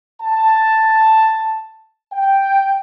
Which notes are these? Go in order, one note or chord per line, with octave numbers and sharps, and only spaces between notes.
A5
G5